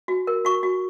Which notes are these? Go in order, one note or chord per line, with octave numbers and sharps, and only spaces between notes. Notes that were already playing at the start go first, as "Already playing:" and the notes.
F#4
A#4
F#4 C#6
F#4